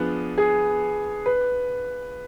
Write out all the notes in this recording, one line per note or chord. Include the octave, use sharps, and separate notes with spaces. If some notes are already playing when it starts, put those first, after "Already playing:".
Already playing: F3 B3 D4 G#4
G#4
B4